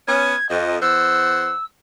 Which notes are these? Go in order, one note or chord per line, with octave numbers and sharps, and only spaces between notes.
B3 C#4 G#6
F2 D#5
E2 C5 F#5 E6